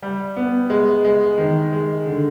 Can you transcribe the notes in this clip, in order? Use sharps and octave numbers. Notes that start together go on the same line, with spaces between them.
G3
B3
G#3
G#3
D#3
G#3
D3